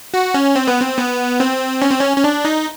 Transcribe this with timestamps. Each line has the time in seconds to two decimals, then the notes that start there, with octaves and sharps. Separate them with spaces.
0.14 F#4
0.34 C#4
0.56 C4
0.67 B3
0.80 C4
0.97 B3
1.40 C4
1.82 C#4
1.91 C4
2.00 C#4
2.17 C#4
2.24 D4
2.45 D#4